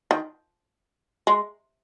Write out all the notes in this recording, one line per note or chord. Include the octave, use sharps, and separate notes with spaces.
D#3
G#3